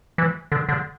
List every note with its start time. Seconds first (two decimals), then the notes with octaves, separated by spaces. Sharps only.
0.18 E3
0.52 D3
0.69 D3